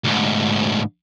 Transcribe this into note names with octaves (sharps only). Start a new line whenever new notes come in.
D2 G#2